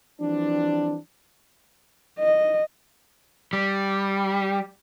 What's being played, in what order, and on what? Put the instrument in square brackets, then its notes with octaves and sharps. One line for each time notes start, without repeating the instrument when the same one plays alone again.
[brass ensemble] E3 F3 G3 C4 D4
[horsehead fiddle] D#5
[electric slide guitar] G3